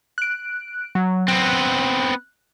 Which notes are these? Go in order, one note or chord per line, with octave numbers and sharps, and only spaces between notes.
F#6 D7
F#3
B3 C4 F#6